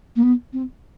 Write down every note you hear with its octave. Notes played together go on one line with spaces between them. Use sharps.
A#3
B3
C4